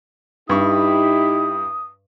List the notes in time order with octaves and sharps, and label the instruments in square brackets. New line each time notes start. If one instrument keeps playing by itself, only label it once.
[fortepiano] G2 C#6 [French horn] D#4 [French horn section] E4 G4 [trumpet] D#6